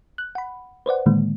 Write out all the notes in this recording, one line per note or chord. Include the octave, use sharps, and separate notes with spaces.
F#6
F#5 B5
B4 C5 D5 F#5
A2 D3 D#3 G#3 A#3